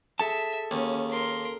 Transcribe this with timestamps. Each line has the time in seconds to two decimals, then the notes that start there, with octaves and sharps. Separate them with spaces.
0.19 G#4 A4 E5 A5
0.71 D#2 C#4
1.10 A#4 C6